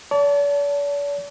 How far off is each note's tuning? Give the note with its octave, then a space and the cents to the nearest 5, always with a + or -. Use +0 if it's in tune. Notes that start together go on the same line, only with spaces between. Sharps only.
D5 -45 A5 +0